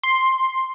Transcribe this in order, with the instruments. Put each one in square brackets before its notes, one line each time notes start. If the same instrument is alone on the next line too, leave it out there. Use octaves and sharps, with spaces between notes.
[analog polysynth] C6